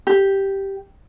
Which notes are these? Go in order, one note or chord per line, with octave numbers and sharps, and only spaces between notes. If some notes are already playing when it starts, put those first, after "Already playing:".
G4